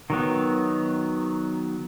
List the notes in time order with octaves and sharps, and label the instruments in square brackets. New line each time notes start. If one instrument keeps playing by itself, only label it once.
[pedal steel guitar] D#3 F#3 B3